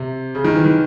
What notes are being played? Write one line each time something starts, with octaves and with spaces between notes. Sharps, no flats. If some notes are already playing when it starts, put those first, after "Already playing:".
Already playing: C3
C#3
D#3
E3
D#3